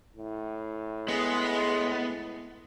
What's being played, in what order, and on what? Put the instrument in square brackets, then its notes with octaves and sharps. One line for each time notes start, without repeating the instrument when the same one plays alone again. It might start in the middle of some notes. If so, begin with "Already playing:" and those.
[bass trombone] A2
[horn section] G#3 [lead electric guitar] B3